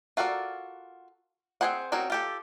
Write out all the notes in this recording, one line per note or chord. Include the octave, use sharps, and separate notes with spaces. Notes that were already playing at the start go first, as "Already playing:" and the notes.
F4 F#4 A4 A#4 D5
C4 E4 G#4 C5 F#5
C4 C#4 D#4 F#4 A#4
F4 G4 A4